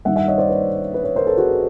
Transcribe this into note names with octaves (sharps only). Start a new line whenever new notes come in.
G2 D#3 G3 E5 F#5
E5 F#5
C#5 D#5
C5 D5
B4 C#5
B4 C#5
B4 C#5
A#4 C5
A4 B4
F#4 G#4